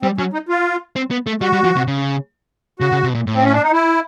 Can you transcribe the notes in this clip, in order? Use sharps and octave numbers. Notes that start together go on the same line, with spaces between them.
G3 C4
F#3 C#4
D#4
F4
C4
B3
A3
G3 F#4
G3
F3
C3
C#3
C#3 F#4
C#3
C3
B2
A#2
A2
C4
C#4
D4
D#4
E4